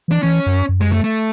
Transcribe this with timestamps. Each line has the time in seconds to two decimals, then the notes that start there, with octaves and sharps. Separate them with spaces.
0.08 E3 D4
0.23 E3 C#4
0.46 F#2
0.69 F#2
0.81 G#3
0.92 A3
1.04 A3